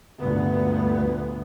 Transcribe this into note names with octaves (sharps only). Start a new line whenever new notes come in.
D2 G2 A#2 B3